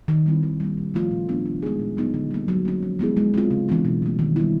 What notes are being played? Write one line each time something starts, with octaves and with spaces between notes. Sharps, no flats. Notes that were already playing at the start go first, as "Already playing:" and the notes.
D#3
G3 C4 E4
D#3
G3 A#3
A#2
F3 A3 C#4 F4
A#2
G3 B3 D4
D#3
G#3 B3 D#4 G#4
A#2
F#3 B3 D#4
D3
G3 A#3
F#3
A#3 C#4
F3
G#3 B3 E4 G#4
G#3
C4 F4
C#3
E3 G#3 B3 D4
B2
G3 A#3
D#3
G3 B3 E4